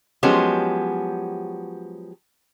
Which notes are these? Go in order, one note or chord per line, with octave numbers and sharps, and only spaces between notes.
F3 F#3 G#3 B3 C#4 G4